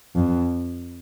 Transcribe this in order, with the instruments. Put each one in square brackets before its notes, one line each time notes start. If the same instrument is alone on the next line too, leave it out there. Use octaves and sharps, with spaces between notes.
[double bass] F2